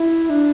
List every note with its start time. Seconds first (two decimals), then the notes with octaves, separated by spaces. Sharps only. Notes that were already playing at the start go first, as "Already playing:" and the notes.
Already playing: E4
0.30 D4